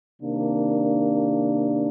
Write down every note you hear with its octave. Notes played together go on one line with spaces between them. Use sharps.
C3 D#3 A#3 D4